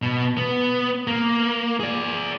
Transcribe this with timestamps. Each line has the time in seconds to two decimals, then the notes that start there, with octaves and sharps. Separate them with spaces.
0.02 B2
0.37 B3
1.07 A#3
1.80 G#4 D5